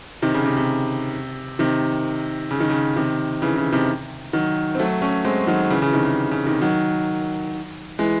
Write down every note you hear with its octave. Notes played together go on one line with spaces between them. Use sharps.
C3 D#3
C#3
C3
C3
C3 D#3
C#3
D#3
C#3
C3 D#3
C#3 E3
C#3 E3
C3 D#3
D#3 F#3
C4
F#3 A3
A3 C#4
G#3 C4
D#3 F#3
C#3 E3
C#3 E3
C3 D#3
C#3
C#3
C3 D#3
D#3 F#3
E3 G#3